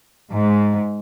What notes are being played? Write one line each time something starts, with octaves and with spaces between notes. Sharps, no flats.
G#2